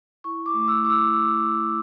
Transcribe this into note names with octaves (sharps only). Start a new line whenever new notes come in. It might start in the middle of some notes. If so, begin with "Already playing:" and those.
E4 C#6
D6
A3
E6
E4 D6
E6